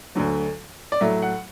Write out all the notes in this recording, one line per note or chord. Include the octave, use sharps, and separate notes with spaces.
D2 D3 F#3 A3
D5
A2 F#3 A3 E5
F#5